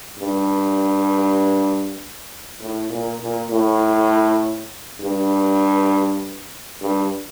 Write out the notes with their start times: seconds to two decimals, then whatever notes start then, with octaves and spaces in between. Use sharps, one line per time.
0.19 G2
2.60 A2
2.90 A#2
3.21 A#2
3.50 A2
5.01 G2
6.82 G2